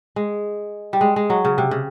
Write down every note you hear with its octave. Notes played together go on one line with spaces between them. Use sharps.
G#3
G3
G#3
G#3
F#3
C#3
C3
C#3